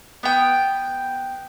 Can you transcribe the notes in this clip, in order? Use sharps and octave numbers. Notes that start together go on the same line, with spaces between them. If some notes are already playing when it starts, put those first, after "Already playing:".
B3 G5